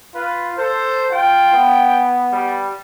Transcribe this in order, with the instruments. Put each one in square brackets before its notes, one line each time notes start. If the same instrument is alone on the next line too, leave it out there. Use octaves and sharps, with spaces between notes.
[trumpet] F4 [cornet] B4
[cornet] A4 [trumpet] C5
[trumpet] F4 [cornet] G5
[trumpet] B3
[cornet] G3